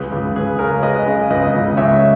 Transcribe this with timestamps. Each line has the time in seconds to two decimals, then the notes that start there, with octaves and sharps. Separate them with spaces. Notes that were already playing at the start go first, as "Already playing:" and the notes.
Already playing: C#2 G#4 B4
0.12 C#2
0.36 C#2 G#4 B4
0.59 C#3 A#4 C#5
0.83 G#3 B4 D#5
1.06 C#3
1.30 C#2 B4 D#5
1.54 C#2
1.77 C#2 C#5 E5